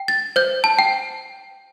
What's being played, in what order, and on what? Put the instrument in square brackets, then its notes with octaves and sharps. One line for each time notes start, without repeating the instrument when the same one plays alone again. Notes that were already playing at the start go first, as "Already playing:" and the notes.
Already playing: [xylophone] G5
A6
C5 G6
A5
G5